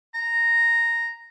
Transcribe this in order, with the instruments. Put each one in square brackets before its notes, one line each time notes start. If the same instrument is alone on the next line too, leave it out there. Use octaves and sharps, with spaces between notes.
[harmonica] A#5